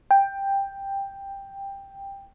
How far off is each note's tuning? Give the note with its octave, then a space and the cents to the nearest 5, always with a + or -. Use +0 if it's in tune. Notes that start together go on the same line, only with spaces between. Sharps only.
G5 +10